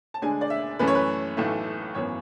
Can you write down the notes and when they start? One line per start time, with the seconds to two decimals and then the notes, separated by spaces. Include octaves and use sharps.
0.14 A5
0.22 D2 D3 G#3 D4 G#5
0.41 D5
0.50 E5
0.79 F#2 E3 A3 C#4 B4
0.87 C#5
0.95 B4
1.37 B1 A2 E3 A3
1.95 G#1 F#2 E3 B3 C#5